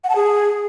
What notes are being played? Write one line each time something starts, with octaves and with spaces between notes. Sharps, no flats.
F#5
A5
G#4